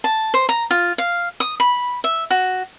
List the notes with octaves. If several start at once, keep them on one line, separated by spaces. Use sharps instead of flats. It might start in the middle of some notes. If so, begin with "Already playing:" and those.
A5
C5
A#5
F4
F5
D#6
B5
E5
F#4